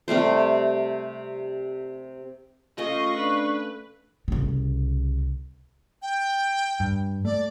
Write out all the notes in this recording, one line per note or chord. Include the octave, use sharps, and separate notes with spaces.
C3 G3 A3 C5
A3 C#4 F4 G#4 D#5 F5 C#6
D4 B4
C2 C#3
G5
G2
A3 D5